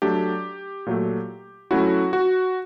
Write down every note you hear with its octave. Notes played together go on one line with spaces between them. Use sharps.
F#3 A3 D4 G4
A#2 F#3 A3
F#3 A3 C#4 E4 F#4
F#4